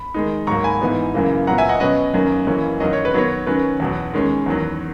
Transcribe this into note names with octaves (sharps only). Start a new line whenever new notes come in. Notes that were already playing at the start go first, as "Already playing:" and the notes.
Already playing: B5
D#3 G#3 D#4
G#2 F#3 A#3 A#5 C#6
G#5 B5
G#2 E3 B3 D#4
F#2 C#3 E3 A#3
A#2 F#3 B3 F#5 A#5
E5 G#5
D#5 F#5
B2 F#3 C#4 B4 D#5
F#2 D#3 A#3 C#4
F#2 E3 A#3 C#4
F#2 D#3 F#3 D#5
C#5
B4
D#3 F#3 B3 C#5
D#3 F#3 C#4 B4
E2 B2 F#3
D#3 G#3 C#4
E2 D#3 F#3